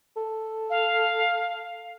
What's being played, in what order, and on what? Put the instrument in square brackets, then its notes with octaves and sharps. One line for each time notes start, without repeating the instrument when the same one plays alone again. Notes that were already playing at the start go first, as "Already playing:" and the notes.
[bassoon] A4
[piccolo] F5